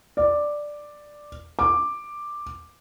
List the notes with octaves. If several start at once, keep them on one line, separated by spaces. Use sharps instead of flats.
D5
D6